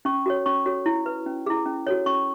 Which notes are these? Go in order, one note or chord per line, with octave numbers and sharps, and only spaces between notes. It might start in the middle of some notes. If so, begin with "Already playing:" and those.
C#4 C#6
F#4 A4 C#5
C#4 C#6
F#4 A4 C#5
E4
B4
C#4
E4 G#4
C#4
F#4 A4 C#5
C#4 C#6